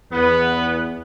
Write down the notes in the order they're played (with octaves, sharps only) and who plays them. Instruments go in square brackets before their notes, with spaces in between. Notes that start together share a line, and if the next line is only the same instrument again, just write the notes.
[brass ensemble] E2 [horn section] B3 B4